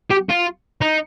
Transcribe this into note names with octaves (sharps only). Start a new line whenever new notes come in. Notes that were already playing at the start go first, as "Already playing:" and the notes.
G4
F4
D#4